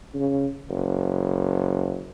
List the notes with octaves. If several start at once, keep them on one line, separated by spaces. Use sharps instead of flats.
C#3
F#1